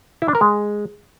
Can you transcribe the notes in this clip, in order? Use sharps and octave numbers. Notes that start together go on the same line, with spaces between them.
E4
D4
A#4
G#3